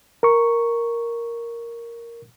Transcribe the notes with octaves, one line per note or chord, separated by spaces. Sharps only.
A#4 C#6